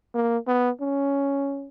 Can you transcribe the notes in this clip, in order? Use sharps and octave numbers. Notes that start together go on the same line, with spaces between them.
A#3
B3
C#4